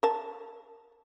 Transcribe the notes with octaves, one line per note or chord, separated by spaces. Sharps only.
A#4 A5